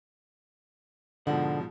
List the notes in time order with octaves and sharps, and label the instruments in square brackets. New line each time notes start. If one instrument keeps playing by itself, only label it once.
[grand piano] G#2 B2 F3 [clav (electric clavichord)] D3 [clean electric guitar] F#5